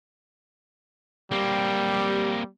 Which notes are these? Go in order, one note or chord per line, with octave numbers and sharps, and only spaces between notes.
G3 A#3 C4 G4